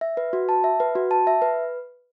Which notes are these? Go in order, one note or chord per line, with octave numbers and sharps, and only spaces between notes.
E5
B4
F#4
A5
E5
B4
F#4
A5
E5
B4